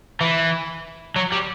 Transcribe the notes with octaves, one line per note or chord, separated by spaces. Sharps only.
E3
F#3
G3